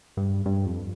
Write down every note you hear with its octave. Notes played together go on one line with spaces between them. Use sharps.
G2
G2
F2